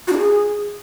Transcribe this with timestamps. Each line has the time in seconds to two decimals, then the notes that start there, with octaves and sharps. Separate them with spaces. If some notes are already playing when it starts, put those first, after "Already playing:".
0.07 F#4
0.13 D4
0.18 G#4